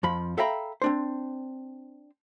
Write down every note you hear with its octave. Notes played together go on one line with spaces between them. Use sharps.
F2 F3 B5
A4 E5 F5 G5 A#5 B5
C4 D4 C5